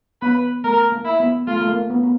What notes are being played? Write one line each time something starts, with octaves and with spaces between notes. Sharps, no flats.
B3 B4
A3 A#4
A#3
E4
B3
A3 F4
A3
A#3
B3
B3